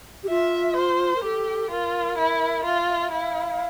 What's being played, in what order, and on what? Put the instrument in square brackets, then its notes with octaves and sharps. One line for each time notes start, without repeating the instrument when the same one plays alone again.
[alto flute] G4
[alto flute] F4 [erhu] E5
[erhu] C5
[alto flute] A#4
[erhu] G4 [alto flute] A4
[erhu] F4 [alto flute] A#4
[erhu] E4
[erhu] F4 [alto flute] E5
[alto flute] E5
E5
[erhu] E4 [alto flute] F5